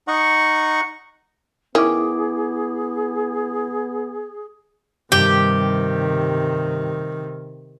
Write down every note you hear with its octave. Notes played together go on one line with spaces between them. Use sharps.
D#4 D#5 F#5 C#6
D#3 B3 C#4 E4 G#4 D6
G2 C3 D#3 G4